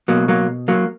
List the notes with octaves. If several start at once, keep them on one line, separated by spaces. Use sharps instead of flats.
B2 F#3 A#3
F#3 A#3
F#3 A#3